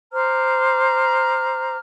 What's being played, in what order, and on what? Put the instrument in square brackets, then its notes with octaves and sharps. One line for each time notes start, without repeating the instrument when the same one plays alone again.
[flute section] C5 A#5 D6 F6